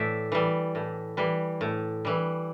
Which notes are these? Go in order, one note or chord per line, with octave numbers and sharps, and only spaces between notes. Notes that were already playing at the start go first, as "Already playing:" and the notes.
Already playing: A2 E3 D5 E5
E3 G3
A2
E3 G3
A2
E3 G3